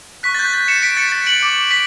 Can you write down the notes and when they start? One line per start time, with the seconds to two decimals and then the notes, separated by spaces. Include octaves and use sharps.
0.23 C#6 F#6 B6
0.35 A6
0.39 G6
0.54 A6
0.68 C#7 E7
0.82 B6 D7
0.97 A6 C#7
1.12 A6
1.26 D7 F#7
1.42 D6 F#6
1.70 B6 D7